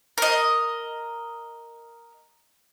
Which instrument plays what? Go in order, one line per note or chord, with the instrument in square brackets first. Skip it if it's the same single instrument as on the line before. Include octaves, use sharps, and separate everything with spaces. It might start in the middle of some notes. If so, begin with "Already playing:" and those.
[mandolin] A#4 D#5